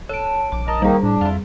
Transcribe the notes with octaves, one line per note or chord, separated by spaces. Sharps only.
A4 C#5 D7
A#1 D6
A#4 D#5 A5
D#3 G3 A#3 D#4 G#4
A2 D4
F2 E4 F4